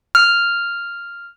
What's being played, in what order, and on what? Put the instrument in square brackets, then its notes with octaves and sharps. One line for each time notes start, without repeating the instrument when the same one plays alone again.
[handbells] F6